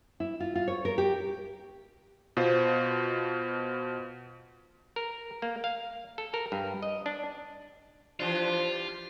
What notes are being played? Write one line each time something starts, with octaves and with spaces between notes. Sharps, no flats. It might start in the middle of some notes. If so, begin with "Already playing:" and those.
E4
F4
F4
C#5
A#4
G4
B2 F4 C5
A#4
A#3
F5
A4
A#4
G2
D#5
D4
E3 F3 G3 D4 F4